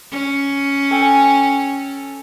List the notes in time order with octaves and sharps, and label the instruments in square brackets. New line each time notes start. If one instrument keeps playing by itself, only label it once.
[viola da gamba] C#4
[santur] A4 G5 G#5